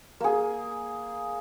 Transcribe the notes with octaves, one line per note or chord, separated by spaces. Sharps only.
A#3 G#4